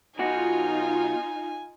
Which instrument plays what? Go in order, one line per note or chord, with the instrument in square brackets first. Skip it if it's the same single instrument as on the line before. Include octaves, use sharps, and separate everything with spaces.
[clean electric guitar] B1 B2 F#4 [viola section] D#4 F4 [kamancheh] G#5